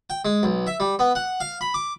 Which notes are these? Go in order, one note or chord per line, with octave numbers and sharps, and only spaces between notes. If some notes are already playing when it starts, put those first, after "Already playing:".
G5
G#3
B1
E5
G3
B3
F#5
F5
B5
D6